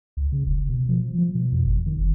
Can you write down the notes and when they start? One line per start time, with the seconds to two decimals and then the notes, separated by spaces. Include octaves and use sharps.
0.17 C#2
0.32 C#3
0.46 E1
0.69 B2
0.89 F3
1.18 F3
1.35 B2
1.52 F2
1.65 G1
1.86 D#3
1.98 F#1